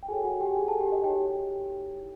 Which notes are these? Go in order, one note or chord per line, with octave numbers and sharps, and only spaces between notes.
G5
F#4 G#4 A4 C#5 G#5
F#4 F#5
G4 G5
G#4 G#5
A4 A5
G4 G5
D#5
D#4 F#4 G4 A4 C#5 G5
E4 G4